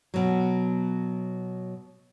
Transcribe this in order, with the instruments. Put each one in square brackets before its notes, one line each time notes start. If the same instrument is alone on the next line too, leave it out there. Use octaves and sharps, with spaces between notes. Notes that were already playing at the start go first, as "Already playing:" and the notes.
[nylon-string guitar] B2 F#3